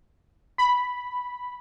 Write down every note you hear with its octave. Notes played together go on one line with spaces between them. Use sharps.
B5